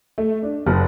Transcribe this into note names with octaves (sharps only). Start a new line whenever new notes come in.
A3
D4
F#1